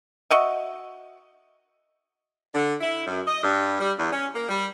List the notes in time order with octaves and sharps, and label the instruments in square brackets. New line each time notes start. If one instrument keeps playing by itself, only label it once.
[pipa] F#4 D#5 E5
[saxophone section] D3
E4
F#2
D#5
G2
G3
E2
C#4
A#3
G3